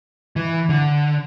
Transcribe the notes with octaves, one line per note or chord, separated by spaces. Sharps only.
E3
D3